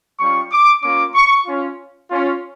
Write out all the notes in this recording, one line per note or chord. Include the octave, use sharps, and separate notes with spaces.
G3 C#4 F4 C#6
D6
A#3 C#4 F4 D6
C#6
C#4 F4
C#4 F4